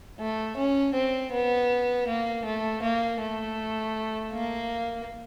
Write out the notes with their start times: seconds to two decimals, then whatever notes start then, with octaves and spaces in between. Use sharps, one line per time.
0.20 A3
0.57 C#4
0.94 C4
1.32 B3
2.07 A#3
2.45 A3
2.82 A#3
3.21 A3
4.33 A#3